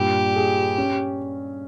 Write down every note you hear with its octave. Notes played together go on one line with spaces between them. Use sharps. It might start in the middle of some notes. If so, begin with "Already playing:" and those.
Already playing: G2 A#2 G4
G#4
C#4